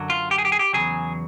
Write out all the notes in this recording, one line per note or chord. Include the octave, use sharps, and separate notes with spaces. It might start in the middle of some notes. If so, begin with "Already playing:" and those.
Already playing: F#2 D3 F#3
F4
G4
G#4
G4
G#4
G4
E2 C#3 F#3 G#4